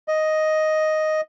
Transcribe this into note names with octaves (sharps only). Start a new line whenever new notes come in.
D#5